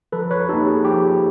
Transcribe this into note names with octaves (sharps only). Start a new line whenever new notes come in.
F3 A4 B4
B4 C#5
A#3 D#4 G4 A4
G#4
F3 G4